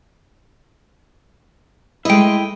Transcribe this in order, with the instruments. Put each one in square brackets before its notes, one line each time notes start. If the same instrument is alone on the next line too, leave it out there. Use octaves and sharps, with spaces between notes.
[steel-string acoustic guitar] G#3 A3 D#5 [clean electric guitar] E4 G5